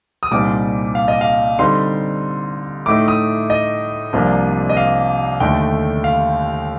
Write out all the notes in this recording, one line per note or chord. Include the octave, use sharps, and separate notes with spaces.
D#6
C2 A#2 G3 C4 D#4 D6
F5
D#5
F5
D3 G3 C4 D#4 C6
A2 A3 D#4 D6
D#6
D#5
C2 C3 F3 A#3 D4
D#5
F5
D#2 D3 A3 D#4 G5
F5